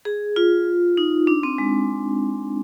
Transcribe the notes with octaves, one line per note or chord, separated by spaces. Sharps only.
G#4
F4
D#4
D4
C4
G#3